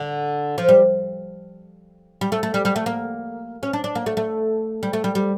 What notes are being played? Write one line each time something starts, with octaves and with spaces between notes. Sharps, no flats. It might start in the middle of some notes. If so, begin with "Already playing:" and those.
Already playing: D3
F3
G3
G3
A3
A3
G3
G3
A3
A#3
C#4
D4
D4
A#3
A3
A3
G3
A3
G3
G3